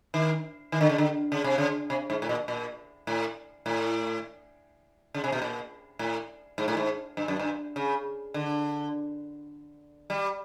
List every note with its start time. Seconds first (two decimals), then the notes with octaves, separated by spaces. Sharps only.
0.14 D#3
0.72 D#3
0.81 D3
0.89 C#3
0.98 D3
1.32 C#3
1.44 C3
1.58 C#3
1.90 C3
2.10 G#2
2.22 A2
2.29 A#2
2.48 A#2
3.07 A2
3.66 A2
5.14 C#3
5.24 C3
5.32 B2
5.42 A#2
5.99 A2
6.58 G#2
6.68 A2
6.77 G#2
7.17 G2
7.28 F#2
7.39 G2
7.76 C#3
8.34 D3
10.10 G3